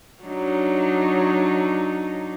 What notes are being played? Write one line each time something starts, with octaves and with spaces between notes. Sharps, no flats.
F#3 D4 D#4